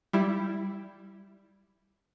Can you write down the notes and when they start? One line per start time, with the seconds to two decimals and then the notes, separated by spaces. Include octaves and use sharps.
0.13 G3 E4